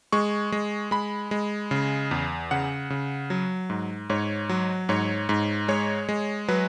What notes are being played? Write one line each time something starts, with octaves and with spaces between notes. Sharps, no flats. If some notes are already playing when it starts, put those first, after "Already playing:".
G#3 C#6
G#3
G#3 B5
G#3
C#3
E2
C#3 F#5
C#3
F#3
G#2
G#2 C#5
F#3
G#2 C#5
G#2
G#3 C#5
G#3
F#3 B4